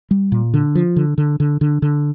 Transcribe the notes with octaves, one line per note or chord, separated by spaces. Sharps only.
G3
A#2
D3
F3
D3
D3
D3
D3
D3